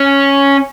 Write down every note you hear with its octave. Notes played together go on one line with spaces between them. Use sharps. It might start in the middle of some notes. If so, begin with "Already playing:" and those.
Already playing: C#4